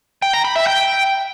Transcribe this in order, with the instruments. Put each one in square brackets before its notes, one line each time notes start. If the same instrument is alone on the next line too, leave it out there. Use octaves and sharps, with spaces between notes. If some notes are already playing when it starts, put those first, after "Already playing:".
[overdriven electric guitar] G5
A#5
B5
E5
G5